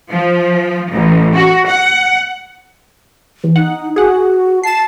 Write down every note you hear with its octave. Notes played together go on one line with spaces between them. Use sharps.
F3
A1
F#4
F#5
E2
D#4 F#5
F#4 G#4 F#5
A5 C7 E7